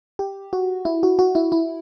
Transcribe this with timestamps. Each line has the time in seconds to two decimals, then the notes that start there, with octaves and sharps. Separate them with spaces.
0.19 G4
0.53 F#4
0.85 E4
1.03 F#4
1.19 F#4
1.35 E4
1.52 E4